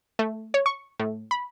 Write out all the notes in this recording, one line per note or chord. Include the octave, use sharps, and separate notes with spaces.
A3
C#5
C#6
A2
B5